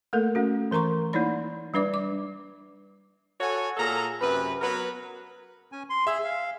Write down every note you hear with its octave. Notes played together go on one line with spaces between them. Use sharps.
A3 A#3 A4 A#4
A3 C#4 F#4
E3 A#4 A#5 C6 C#6
A#3 D#4 E4 C#5 D5 B5
G3 D4 B4 D5 D6
D6
F#4 A4 C#5 F#5 G#5
A#2 G#4 A4 A#5
F#2 C3 B4
F#3 B3 A#4 B4
C#4 G#5
C6
G#4 E5 E6
F5